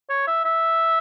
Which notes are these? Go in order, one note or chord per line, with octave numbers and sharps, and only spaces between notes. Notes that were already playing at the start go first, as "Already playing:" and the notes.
C#5
E5
E5